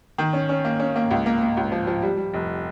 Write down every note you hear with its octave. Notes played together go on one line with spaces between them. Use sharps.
D#3
C#4
C#4
A#3
C#4
A#3
C#2
A#3
A#3
C#2
F3
F3
G3
G3
F1